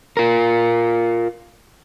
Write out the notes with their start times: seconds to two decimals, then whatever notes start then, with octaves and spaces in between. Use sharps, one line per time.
0.17 F4 A#4